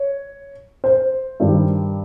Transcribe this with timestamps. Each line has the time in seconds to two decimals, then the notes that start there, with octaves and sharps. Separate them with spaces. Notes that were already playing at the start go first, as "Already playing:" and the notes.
Already playing: C#5
0.84 C5
1.40 G2 D#3 G3